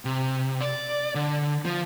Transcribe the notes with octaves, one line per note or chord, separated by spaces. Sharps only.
C3
D5
D3
F3